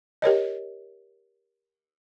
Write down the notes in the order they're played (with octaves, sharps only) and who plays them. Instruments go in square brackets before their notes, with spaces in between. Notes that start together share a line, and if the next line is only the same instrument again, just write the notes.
[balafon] G4 A#4 C#5 D#5